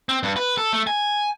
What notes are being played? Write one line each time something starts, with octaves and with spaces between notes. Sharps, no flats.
C4
G2
B4
A4
A3
G#5